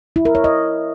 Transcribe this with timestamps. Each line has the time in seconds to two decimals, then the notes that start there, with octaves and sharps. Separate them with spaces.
0.16 E4
0.25 A#4
0.35 C#5
0.44 D#5